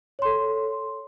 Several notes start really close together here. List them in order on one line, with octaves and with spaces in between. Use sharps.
C#5 C6 A4